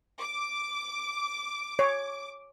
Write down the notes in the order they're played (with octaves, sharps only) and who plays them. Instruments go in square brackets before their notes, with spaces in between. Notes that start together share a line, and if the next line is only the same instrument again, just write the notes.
[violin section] D6
[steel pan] C#5